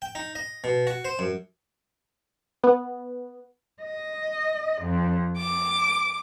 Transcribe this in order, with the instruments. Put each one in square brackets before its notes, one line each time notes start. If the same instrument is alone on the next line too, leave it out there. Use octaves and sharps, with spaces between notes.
[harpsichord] G5
D#4
D#5
B2
F#4
C5
F#2
[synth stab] B3
[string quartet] D#5
F2
D6